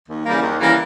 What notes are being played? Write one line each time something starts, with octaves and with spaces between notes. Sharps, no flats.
D#2
C#3 E3 G3 A#3
D#2
C#3 E3 G3 A#3